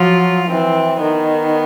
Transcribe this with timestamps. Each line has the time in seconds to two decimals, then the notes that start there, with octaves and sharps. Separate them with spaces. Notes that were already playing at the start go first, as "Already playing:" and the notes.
Already playing: F3 F#3 F4
0.49 E3 C4
1.01 D#3 B3